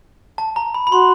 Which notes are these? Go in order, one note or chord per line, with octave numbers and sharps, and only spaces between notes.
A5
A#5
B5
B5
F#4 C6